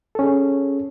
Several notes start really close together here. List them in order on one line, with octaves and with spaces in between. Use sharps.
A4 C#4 G#4 C#5